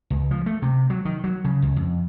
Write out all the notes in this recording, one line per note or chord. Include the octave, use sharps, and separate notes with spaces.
C#2
F3
A3
C3
F#3
D#3
F#3
C#3
C#2
F2